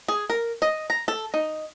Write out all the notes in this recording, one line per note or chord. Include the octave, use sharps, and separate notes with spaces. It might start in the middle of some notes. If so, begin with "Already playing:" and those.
G#4
A#4
D#5
A#5
A4
D#4